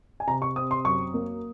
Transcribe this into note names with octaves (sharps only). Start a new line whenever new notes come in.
G#5
C3 A#5
C#6
C4 D#6
C6
F#2 C#6
A#3